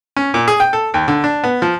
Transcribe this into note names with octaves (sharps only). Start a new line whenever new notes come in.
C#4
A#2
G#4
G5
A4
D#2
D3
D4
B3
F3